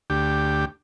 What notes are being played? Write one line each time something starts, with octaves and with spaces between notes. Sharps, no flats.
D2 G4